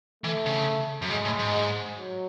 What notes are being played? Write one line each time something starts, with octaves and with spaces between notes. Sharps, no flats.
E3 A3
C#3
F#2
G#2 G#3
A2
G#2
F#3